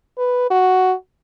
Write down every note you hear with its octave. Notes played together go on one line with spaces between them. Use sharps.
B4
F#4